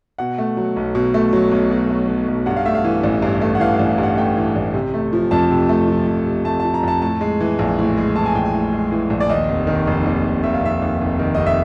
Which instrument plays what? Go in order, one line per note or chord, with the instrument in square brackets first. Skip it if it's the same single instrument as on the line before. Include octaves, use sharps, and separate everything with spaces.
[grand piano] B2 F#5
A3
F#3
B1
B2
A3
F#3
B1
B2
A3
F#3
B1
G2 F#5
F5
A3 E5
F5
E3
A1
G2
A3
F#5
E3 F5
A1 F5
F5
G2
F#5
A3 G5
E3
A1
C3
A3
F3
F2 A5
C3
A3
F3
F2
C3
A3 A5
F3 A5
A#5
F2 A5
A2 A5
G#3
E3
A#1
A2
G#3
E3 A5
G#5
A#1 G5
G#5
A2
G#3
E3
A#1
D5
D#2 D#5
F1
D#3
F1
D#2
F1
D#3 E5
F5
F1 E5
D#2
F1
D#3
F1 D#5
E5